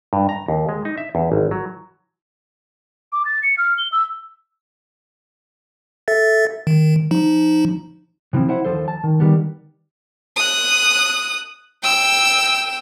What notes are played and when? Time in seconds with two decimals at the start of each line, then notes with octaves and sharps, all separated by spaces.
0.13 G2
0.29 A#5
0.48 D#2
0.69 G#3
0.85 D#4
0.98 E5
1.15 E2
1.32 G#1
1.51 F#3
3.12 D6
3.25 A6
3.43 C#7
3.58 F6
3.78 G7
3.92 E6
6.08 A4 E5 A6
6.67 D#3
7.11 F3 D#4
8.33 C3 E3 F3 C4
8.48 E4 C5 E5 F#5
8.64 D#2 F3 A4 C5
8.88 A5
9.04 D#3
9.20 D#3 G3 B3
10.36 D#6 F#6
11.83 G5 E6